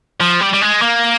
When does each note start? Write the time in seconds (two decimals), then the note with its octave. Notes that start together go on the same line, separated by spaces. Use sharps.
0.20 F3
0.41 G3
0.53 G3
0.61 G#3
0.82 A#3